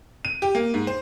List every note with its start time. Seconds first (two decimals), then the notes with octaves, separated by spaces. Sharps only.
0.25 D#7
0.42 G4
0.55 A#3
0.74 G#2
0.87 C5